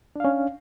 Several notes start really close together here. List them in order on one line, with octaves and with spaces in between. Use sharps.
D4 F5 C#4